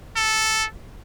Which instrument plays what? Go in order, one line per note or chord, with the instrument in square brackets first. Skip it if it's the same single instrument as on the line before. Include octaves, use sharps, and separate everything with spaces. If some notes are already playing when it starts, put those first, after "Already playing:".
[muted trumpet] A4